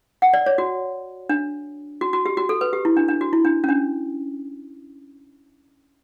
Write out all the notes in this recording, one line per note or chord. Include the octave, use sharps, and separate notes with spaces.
F#5
D5
C#5
F#4
D4
F#4
F#4
G4
F#4
A4
B4
G4
E4
D4
D4
F#4
E4
D4
C#4
D4